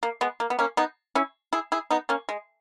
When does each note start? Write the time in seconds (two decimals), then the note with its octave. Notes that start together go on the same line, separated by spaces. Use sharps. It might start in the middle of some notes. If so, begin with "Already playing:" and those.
0.03 A#3
0.21 G#3 B3
0.40 A#3
0.50 B3
0.59 A#3 C#4
0.77 B3 D#4
1.15 C#4 E4
1.53 E4 G#4
1.72 E4 G#4
1.91 B3 D#4
2.09 A#3 C#4
2.29 G#3